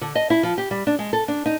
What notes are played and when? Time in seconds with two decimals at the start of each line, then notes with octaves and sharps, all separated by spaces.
0.01 D3
0.15 D#5
0.30 E4
0.43 F3
0.58 G4
0.71 G3
0.87 D4
0.99 G#3
1.13 A4
1.28 D4
1.46 D#4